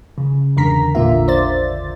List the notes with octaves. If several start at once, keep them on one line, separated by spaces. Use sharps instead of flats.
C#3
E2 G#2 D3 A#4 A#5 B6
A1 A#2 D3 A#3 F4 E5
C5 D5 A6